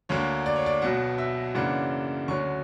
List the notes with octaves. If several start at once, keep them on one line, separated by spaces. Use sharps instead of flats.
D2 D3 A#3 C#5
D5
C#5
D5
B1 B2 F#3 F#5
E5
F#2 C#3 E3 A#3 D4 F#5
D2 D3 F#3 C#4 C#6